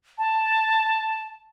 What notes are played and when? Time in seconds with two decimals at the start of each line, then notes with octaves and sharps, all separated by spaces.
0.18 A5